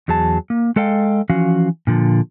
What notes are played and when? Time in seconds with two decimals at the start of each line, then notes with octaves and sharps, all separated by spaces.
0.08 E2 F#3 G#4 A5
0.50 A#3
0.76 G#3 A4 D#5 F5 G5
1.30 E3 F3 C#4 F#4 F5
1.87 A#2 D3 F3